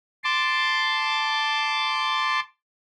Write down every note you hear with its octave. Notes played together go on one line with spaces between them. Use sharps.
A5 C6 D6